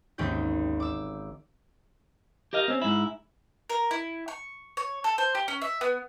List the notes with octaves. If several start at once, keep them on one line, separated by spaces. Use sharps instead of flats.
G#1 D#2 C4 C#4 G4 G6
D6 E6
G4 A#4 D#5 F5
C4 C#4
G#2 E4
A#4
E4
C#6
C#5
A4
C5
G4
C#4
E5
B3